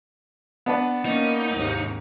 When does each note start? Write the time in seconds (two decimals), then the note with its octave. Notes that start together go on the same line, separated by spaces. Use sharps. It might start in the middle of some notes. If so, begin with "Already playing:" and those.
0.66 B3 D4 B4
1.05 A#3 C#4 D#4
1.53 D#2 G#2 C3